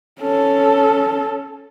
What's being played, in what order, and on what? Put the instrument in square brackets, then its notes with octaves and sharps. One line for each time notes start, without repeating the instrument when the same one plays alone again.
[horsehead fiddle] C#4 A4